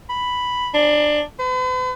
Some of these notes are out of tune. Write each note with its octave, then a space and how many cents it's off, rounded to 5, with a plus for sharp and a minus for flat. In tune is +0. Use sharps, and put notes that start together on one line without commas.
B5 +0
D4 +20
B4 +45